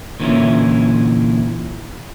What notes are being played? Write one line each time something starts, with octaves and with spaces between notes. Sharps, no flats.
A#2 D3 E3 B3 C#4 E4